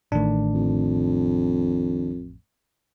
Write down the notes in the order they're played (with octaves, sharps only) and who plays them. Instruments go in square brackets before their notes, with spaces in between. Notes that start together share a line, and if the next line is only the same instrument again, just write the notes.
[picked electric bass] A1 A2 [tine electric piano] D#3 D4
[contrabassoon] F2